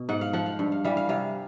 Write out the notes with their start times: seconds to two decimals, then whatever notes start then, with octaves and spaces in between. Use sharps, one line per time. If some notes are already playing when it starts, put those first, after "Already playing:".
Already playing: B2
0.09 G#2 F#5
0.21 F5
0.33 F3 F#5
0.46 F5
0.59 G2
0.72 F5
0.84 E3 G3 F5
0.97 F5
1.09 C3 F5